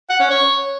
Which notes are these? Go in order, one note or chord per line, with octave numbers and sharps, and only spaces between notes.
F#5
C#4
C#5